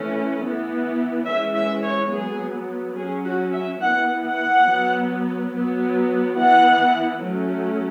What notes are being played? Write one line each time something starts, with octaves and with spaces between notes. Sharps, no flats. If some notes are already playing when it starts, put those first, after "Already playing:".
Already playing: E3 A3 C#4
E3 B3
E3 G#3 C#4 E5
E5
C#5
F#3 B3 G#4
F#3 C#4 G#4
F#4
E5
E3 B3 F#5
F#5
F#3 B3
F#3 B3
E3 B3 F#5
F#3 A3 C#4